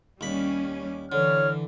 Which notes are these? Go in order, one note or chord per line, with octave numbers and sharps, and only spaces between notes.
D#2 G3 C#4 B5
D3 E3 C#5 F6